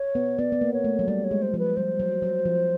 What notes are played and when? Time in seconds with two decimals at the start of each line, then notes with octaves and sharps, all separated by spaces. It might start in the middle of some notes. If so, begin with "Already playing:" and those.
Already playing: C#5
0.15 B3
0.38 B3 D5
0.52 B3
0.61 A#3
0.73 C#5
0.84 A3
0.99 F#3
1.08 G3 D5
1.24 C#5
1.31 G#3
1.42 C5
1.54 F3
1.59 B4
1.77 G3 C5
2.00 F#3
2.23 F#3
2.45 F3